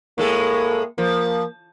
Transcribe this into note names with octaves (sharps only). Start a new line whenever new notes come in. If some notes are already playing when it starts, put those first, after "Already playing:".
A2 G#3 A#3 A4
F3 A#3